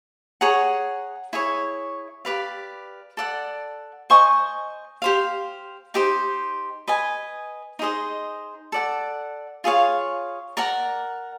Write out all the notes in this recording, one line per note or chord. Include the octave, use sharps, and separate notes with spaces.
G#4 C#5 F#5 A#5
E4 G#4 C#5
G4 B4 D5 F5
A4 D5 F#5
C5 D#5 G#5 C#6
G4 C5 F5
D#4 G4 C5
B4 D#5 G#5
D#4 G#4 C5 D#5
A4 D5 F#5
F4 G#4 C#5 F5
A#4 D5 F#5 A#5